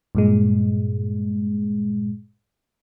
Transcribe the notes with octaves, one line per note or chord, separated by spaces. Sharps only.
G2 A#2 G#3